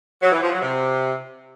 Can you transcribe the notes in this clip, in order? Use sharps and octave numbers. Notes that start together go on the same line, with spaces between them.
F#3
E3
F3
F#3
C3